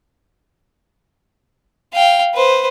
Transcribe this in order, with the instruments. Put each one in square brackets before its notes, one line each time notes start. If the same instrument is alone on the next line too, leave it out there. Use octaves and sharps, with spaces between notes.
[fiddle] F5 G5
B4 C5